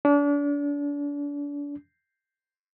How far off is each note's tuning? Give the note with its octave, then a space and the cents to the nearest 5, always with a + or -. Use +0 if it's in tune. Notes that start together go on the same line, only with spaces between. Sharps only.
D4 -35